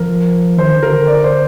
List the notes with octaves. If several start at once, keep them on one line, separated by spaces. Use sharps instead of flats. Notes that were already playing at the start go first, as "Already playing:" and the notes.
Already playing: F3 A#4
D#3 C5
D3
D3 A#4
D3
D5
C5